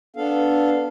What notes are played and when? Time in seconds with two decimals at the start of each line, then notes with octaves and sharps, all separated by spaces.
0.16 B3 D4 A4 F5